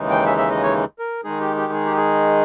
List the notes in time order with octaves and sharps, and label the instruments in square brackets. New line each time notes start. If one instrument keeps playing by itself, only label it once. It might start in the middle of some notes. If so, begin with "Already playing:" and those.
Already playing: [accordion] D#2 C#3 E3 G#3 D#4
G5
E5
E5
D#5
C#5
A#4
D#3 G#3 D#4 G#4
G4
G4
G#4
G4
G#4